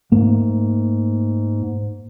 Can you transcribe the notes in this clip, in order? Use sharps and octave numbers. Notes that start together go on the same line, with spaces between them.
G#2 A3 A#3